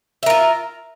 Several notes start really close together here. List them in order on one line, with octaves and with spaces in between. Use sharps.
E5 A#4 F4